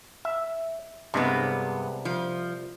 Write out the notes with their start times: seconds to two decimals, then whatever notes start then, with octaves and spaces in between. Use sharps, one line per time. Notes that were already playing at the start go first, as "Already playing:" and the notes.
0.25 E5
1.14 C2 G2 C3 G#3 B3
2.05 F3